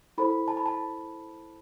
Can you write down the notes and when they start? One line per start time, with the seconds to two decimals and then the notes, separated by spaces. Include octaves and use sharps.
0.18 E4 A4 C5 B5
0.48 A5
0.57 B5
0.66 A5